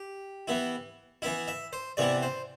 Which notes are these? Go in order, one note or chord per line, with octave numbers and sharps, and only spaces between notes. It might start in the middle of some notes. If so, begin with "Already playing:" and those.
Already playing: G4
E3 B3 E4
E3 B3 E4 E5
E5
C5
C3 E3 B3 E4 D5
C5